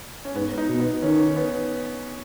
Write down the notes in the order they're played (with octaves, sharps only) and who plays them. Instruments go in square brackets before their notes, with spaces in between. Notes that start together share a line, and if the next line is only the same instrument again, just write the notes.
[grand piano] C#4
[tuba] G#2 [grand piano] B3
[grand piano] D#4
[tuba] B2
[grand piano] B3
[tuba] D#3 [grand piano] C#4
[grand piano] B3